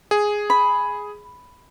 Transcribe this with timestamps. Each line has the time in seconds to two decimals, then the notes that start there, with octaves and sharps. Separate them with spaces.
0.11 G#4
0.50 B5